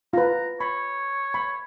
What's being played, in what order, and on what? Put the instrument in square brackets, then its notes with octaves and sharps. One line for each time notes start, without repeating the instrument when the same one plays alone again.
[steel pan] F4 B4 [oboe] A#5
[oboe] C#5 [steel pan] B5
[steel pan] B5